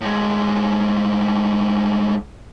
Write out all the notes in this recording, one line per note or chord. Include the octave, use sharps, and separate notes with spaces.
A2 G#3